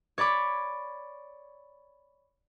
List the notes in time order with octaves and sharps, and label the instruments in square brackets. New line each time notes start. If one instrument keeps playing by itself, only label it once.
[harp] C#5 D5 B5 D6